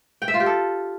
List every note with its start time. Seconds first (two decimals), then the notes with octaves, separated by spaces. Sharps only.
0.22 G5
0.28 E5
0.34 F4
0.40 G4
0.46 A4